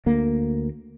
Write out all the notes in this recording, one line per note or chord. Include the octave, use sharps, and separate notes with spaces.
D2 A#3